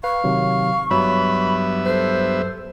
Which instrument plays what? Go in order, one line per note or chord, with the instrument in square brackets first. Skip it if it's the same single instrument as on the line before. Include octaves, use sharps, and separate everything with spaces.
[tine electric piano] B4 [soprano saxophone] F5 [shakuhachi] C#6
[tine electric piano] C3 D#3 F#3
[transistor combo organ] G2 B3 E5 [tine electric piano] F#3 [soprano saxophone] B5
[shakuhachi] A4 [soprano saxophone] C5